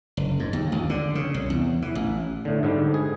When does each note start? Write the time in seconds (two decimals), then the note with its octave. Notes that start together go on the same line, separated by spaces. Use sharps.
0.17 F#1
0.40 G#2
0.53 D#2
0.72 C#2
0.90 D3
1.15 C#3
1.34 C2
1.50 E2
1.82 E3
1.95 A1
2.45 A2 D3
2.63 G#2 D3 G3
2.94 G#4